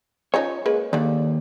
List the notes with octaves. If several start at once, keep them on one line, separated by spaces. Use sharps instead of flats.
F3 C#4 D#4 C#5
G#3 A#3 B4
D#2 D3 D5